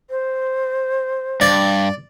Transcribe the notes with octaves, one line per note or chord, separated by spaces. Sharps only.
C5
G2 D5